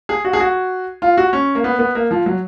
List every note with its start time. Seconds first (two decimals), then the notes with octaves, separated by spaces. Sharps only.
0.09 G#4
0.25 F#4
0.33 G#4
0.40 F#4
1.02 F4
1.17 F#4
1.33 C#4
1.55 A#3
1.64 B3
1.79 B3
1.95 A#3
2.11 F3
2.26 F#3